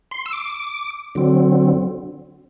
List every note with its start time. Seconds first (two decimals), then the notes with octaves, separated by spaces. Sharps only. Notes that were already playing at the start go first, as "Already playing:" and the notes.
0.11 C6
0.26 E6
0.33 D6
1.15 D3 F#3 C4